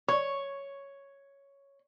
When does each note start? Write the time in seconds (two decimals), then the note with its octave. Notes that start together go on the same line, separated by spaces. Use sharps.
0.09 C#5 C#6